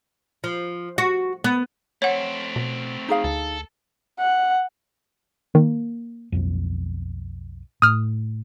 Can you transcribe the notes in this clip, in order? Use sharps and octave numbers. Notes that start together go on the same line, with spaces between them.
F3
F#4
B3
A3 C4 C#5 F#5
B2
D#4 G#4 F5
D2 A4
F#5
D#3 A#3
B1 F2
A2 D#6 F6